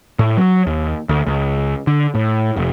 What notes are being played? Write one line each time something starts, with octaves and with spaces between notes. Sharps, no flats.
A2
F#3
D#2
D2
C#2
D3
A2
F1